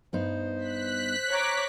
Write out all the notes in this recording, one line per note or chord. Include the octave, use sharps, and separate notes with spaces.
G2 B3 D#4 C5
F#6 B6
C#5 A#5 D6